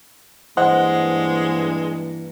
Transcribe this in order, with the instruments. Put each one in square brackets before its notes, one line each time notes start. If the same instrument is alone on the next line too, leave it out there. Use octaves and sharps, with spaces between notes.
[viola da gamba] G2 A#3 [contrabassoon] E3 [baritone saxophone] G#3 [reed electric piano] C5 D#5 F#5